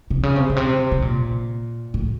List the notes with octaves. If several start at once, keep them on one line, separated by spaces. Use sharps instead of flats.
C3
C#3
C3
A#2
C3
C3
A#2
A2